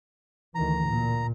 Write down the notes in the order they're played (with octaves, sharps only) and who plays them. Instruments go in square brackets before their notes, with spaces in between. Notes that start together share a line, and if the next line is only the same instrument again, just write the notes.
[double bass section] D2 D#3 E3 [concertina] A#5
[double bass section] A#2